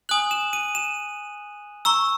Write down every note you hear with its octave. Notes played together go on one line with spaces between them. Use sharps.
G#5 D#6 F#6 F#7
E7
D#7
E7
A#5 C#6 E6